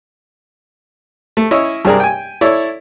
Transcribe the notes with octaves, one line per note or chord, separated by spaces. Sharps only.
A3
C#4 E4 C#5 D#5
G2 C3 D4 G#4 A#4
G5 G#5
E4 A4 C#5 D5